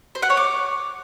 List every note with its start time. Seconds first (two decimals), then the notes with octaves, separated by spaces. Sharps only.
0.15 C5
0.22 F#5
0.30 C#5
0.37 D6